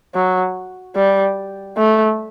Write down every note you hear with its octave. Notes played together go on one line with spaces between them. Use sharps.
F#3
G3
A3